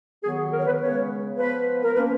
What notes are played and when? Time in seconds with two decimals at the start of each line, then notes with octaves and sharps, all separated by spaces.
0.23 D#3 F#3 B3 G#4
0.37 G#4
0.52 A#4
0.59 C#5
0.66 B4
0.80 C#3 G#3 B3 C#5
1.37 F3 B3 B4
1.84 A#4
1.95 F3 A#3 C#4 B4